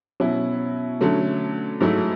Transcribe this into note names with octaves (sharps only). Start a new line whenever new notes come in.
B2 F#3 C#4 E4
D3 F#3 A3 C#4
G#2 F#3 A3 E4